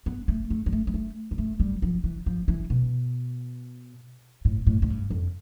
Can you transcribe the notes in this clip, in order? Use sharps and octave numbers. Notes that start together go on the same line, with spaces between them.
B3
A3
A3
G3
A3
G3
A3
G3
A3
G3
F3
E3
F3
E3
B2
A2
A2
A2
G2
F2